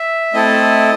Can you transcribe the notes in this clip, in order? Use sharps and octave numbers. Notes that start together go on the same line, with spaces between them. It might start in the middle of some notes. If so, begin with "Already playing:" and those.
Already playing: E5
A3 C4 E4 A4 D#5